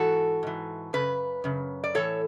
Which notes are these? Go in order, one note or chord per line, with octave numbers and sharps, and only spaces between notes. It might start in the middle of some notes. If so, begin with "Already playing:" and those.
Already playing: G#2 E3 F#4 A4
G#2 E3
F#2 C#3 B4
F#2 C#3
D5
A2 E3 A4 C#5